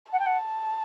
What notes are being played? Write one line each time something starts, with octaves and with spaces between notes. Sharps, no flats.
F#5 A5
G5
F#5